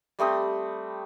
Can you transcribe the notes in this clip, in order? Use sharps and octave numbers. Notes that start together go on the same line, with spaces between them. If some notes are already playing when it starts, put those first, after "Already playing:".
G3 A3 C4 D#6